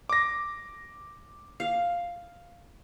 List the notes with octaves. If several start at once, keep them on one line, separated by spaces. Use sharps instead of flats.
D6 A#6
F5